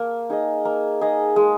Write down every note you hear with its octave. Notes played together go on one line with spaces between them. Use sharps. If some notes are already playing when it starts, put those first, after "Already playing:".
Already playing: A#3
D#4 G#4 D#5
A#3
D#4 G#4 D#5
G#3